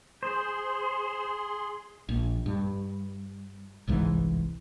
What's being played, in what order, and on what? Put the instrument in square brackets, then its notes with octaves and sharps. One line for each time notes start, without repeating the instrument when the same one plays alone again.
[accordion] G#4 C6 [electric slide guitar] C5
[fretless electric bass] A#1
G2
G1 C2 G#2 E3